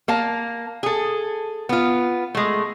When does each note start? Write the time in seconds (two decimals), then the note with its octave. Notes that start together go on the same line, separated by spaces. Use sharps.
0.08 A#3 F5 A5
0.83 G#4 A4
1.69 B3 F4
2.35 G#3 A3